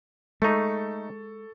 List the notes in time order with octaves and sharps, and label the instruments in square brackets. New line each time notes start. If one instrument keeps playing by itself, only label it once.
[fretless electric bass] G#3 [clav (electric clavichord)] A3 D#4 [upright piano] A4 C#6